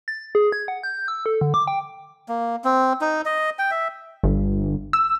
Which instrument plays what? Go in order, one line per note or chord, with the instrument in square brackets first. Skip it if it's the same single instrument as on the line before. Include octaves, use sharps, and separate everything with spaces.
[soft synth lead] A6
G#4
G#6
F#5
G6
E6
A4
D3
D6
G5
[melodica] A#3
C4
D#4
D#5
G5
E5
[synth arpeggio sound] G1
E6